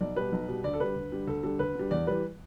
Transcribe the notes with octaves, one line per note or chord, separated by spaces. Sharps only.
B1 D5
B2 G3 B4
B1
B2 G3
D2 D5
A4
D3 G3 B4
D2
D3 G3
D2 A4
D3 G3 A4
D2 B4
D3 G3
E2 D5
E3 G3 B4